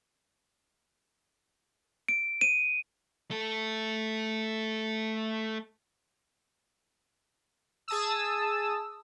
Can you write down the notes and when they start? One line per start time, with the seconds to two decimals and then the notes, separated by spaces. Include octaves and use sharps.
2.08 D7
2.41 D#7
3.31 A3 A4
7.88 G#4 A5 D#6 E6